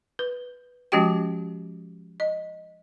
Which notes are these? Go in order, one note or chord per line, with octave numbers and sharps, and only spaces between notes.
B4
F3 G#3 C#4 F#4 G4 G5
D#5